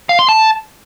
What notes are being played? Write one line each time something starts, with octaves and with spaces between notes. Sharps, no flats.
F5
C6
A5